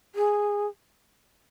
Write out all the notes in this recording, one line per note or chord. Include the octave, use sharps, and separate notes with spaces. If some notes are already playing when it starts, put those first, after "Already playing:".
G#4